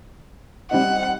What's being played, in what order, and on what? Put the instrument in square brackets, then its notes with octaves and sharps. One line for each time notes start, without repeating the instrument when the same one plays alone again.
[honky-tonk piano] G3 C4 D#4 [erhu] F#5